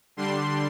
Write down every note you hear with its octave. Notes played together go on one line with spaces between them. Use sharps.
D3 G3 D4 C6